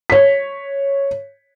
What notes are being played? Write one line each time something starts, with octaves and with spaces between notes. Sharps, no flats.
C#5 B6